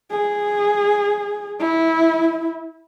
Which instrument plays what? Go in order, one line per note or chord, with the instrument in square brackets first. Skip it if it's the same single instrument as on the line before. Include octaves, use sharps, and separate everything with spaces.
[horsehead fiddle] G#4
E4